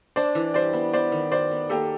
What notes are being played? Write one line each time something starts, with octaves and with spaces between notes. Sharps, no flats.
D4 C5 D5
E3
G3 C5 D5
B3
B3 C5 D5
D#3
F#4 C5 D5
B3
A#3 G4 A4